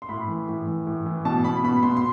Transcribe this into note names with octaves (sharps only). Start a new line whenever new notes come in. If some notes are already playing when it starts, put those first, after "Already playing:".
C6
A2 B5
E3
A2
E3
A2
E3
B2 A5
B2 B5
B2 B5
B2 C6
C6